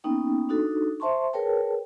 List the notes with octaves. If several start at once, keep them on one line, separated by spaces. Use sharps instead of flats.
A#3 B3 C#4 D#4 G5
D4 D#4 F#4 A4
C5 E5 A5 C6 C#6
G#4 A#4 B4 C#5 G5 A5